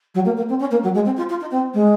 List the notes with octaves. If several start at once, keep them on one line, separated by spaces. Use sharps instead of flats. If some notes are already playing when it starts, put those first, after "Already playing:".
F#3
A#3
A#3
C4
C#4
A#3
F#3
G#3
C4
F4
F4
D#4
C4
G#3